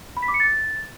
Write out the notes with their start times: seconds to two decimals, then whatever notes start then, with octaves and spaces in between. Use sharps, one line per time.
0.17 B5
0.22 B6
0.28 D6
0.34 C#7
0.40 A6